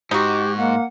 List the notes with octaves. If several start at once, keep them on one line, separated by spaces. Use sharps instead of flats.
G#2 D#4 F#4 G4
A#3 F#5